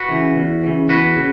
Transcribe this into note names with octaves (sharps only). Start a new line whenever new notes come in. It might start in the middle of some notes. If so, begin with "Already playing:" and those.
Already playing: F#4 B4
C#3 E3
E2
C#3 E3
E2 F#4 B4
C#3